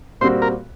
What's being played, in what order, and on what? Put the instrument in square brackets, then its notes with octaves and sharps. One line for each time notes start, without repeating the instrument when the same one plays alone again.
[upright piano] A#2 G3 C4 F#4 [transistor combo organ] C5
[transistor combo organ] A#4